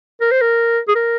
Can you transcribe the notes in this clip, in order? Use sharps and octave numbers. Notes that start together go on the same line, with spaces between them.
A#4
C5
A#4
G#4
A#4